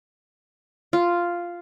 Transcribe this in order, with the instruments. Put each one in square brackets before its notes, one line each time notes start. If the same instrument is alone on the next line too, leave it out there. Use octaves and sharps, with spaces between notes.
[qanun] F4